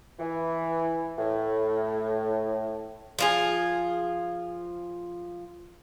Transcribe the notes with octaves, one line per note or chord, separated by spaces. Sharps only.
E3
A2
F3 F4 G#4